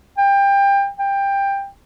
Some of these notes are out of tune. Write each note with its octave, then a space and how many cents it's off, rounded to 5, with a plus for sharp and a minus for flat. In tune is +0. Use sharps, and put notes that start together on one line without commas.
G5 +25
G5 +15